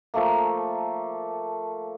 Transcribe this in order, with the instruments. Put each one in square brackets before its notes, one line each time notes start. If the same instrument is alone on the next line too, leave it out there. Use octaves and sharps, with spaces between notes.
[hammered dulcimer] F3 A3 A#3